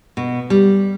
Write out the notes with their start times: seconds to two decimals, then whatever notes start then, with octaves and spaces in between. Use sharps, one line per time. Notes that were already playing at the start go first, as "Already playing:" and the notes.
0.17 B2
0.50 G3